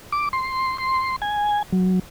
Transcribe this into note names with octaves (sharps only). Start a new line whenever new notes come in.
D6
C6
C6
G#5
F#3